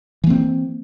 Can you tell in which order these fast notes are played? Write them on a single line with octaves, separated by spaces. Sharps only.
E3 A#3 C4